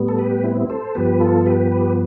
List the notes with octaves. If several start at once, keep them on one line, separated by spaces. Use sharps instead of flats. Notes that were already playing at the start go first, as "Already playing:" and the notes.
Already playing: A2 G3 B3
A4
G4 B4
C4 E4
A4 C5
G2 F3 B3 G4 B4
F4 A4
G4 B4
G4 B4